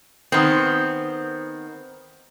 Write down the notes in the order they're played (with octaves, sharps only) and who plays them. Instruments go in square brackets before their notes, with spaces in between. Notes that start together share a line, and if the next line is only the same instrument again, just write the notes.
[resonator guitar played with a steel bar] D#3 B3 C4